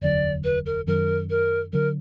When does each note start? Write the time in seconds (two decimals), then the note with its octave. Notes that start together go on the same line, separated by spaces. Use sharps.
0.01 F1 D#2 D3 F#3 D5
0.44 B4
0.66 A#4
0.87 F#2 D#3 F#3 A#4
1.30 A#4
1.73 D3 F#3 A#4